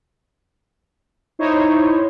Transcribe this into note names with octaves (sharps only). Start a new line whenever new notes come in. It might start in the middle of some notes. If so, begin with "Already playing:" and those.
D#4 E4 C5 C#5